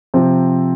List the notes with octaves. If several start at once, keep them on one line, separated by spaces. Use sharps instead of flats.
C3 F3 C4